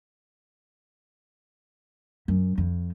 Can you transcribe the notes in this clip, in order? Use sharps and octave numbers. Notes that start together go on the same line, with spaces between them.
F#2
F2